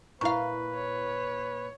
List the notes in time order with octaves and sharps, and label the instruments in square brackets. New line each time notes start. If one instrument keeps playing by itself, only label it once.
[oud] A#2 F5 [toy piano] E4 C#6 [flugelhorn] B4
[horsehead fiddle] C#5